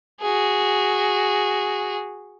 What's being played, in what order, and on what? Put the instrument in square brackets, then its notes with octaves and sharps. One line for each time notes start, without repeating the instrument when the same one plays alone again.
[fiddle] F#4 G#4